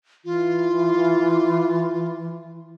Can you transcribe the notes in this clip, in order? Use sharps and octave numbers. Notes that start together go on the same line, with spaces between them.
E3 F4